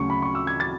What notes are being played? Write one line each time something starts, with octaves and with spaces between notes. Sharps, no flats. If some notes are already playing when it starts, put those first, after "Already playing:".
Already playing: D2 C#3 F#3 C#4 C#6
B5
C#6
E6
G#6
A6